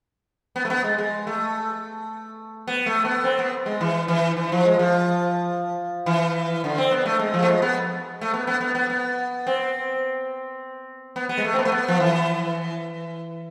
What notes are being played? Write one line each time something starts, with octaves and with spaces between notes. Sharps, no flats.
B3
A3
B3
G#3
G#3
A3
B3
A3
B3
C4
B3
G#3
E3
E3
E3
F3
G#3
F3
E3
D3
C4
B3
A3
G#3
F3
A3
G#3
B3
A3
B3
B3
B3
B3
B3
C4
B3
B3
G#3
A3
C4
B3
A3
B3
F3
E3